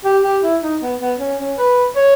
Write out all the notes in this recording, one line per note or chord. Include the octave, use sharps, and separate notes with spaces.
G4
G4
E4
D#4
B3
B3
C#4
C#4
B4
C#5